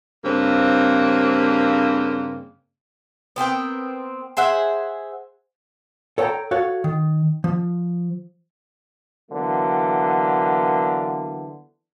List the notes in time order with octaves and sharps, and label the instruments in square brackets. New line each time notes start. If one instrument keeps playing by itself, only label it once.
[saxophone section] G2 C#3 A#3 C4
[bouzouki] B3 C4 A#4 G5
G#4 C5 E5 F#5
[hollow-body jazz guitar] A4 C#5 E5 F#5 G5 A#5
F#4 A4 C#5 F5
D#3
F3
[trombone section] D3 E3 F#3 A#3 B3